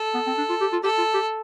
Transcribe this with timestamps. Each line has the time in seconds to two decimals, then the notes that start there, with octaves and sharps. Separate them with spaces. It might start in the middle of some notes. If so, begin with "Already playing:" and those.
Already playing: A4
0.14 B3
0.27 C4
0.38 D4
0.50 F4
0.61 G4
0.73 F4
0.83 G4 A4
0.98 F4
1.14 G4